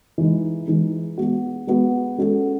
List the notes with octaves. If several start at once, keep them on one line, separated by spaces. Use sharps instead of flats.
E3 G#3 D#4
E3 G#3 D#4
G#3 B3 F#4
G#3 B3 F#4
G#3 C#4 F#4 A4